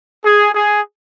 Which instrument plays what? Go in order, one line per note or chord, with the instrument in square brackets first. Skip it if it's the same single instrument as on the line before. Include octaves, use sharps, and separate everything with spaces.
[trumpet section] G#4
G#4